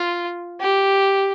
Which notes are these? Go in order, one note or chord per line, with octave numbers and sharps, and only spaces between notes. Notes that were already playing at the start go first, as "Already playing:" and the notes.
Already playing: F4
G4